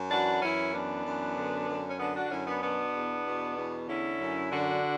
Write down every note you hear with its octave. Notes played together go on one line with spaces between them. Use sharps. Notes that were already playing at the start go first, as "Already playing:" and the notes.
Already playing: F#2
E3 D4 F#4
F#2 C#4 E4
E3 B3 D4
F#2
D3
F#2
C#4
D3 B3 D4
D4 F#4
F#4
F#2 C#4 E4
B3 D4
B2 B3 D4
E2
B2
E2
D3 C#4 E4
F#2
D3 D4 F#4